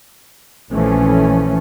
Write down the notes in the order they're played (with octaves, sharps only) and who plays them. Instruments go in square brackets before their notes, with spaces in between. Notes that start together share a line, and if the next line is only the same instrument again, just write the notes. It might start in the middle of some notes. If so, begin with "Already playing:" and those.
[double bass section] A#1 E3 F3 A3 C#4